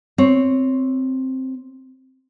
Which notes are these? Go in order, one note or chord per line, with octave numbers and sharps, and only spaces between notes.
C4 C#5